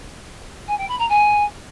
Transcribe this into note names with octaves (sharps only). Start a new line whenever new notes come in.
G#5
G5
B5
A#5
G#5